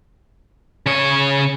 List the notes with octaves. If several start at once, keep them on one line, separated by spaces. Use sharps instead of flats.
C#3 C#5